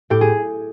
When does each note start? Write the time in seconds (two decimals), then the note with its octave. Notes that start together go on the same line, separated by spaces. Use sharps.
0.10 A2 G4
0.21 G#4